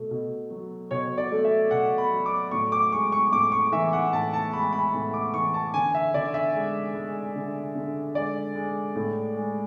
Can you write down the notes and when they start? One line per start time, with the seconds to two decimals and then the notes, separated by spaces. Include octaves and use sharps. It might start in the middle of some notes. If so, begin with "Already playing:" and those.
Already playing: B2 A3
0.11 B2
0.51 F#3
0.91 B2 C#5
1.18 D5
1.32 A3
1.44 E5
1.71 B2 F#5
1.98 B5
2.12 F#3
2.26 D6
2.51 A2 C#6
2.72 D6
2.92 G#3 C#6
3.12 C#6
3.32 A2 D6
3.52 C#6
3.72 E3 E5
3.93 F#5
4.13 A2 A5
4.33 A5
4.53 G#3 B5
4.73 B5
4.93 A2 B5
5.14 D6
5.33 E3 C#6
5.54 A5
5.74 D3 G#5
5.95 E5
6.14 D3 D5
6.34 E5
6.55 G#3
6.94 G#3
7.36 D3
7.75 D3
8.15 G#3 D5
8.55 G#3
8.95 A2
9.37 G#3